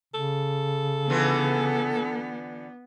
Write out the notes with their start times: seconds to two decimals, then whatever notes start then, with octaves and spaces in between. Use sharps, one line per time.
0.14 C#3 A4
1.09 D3 E3 B3 F4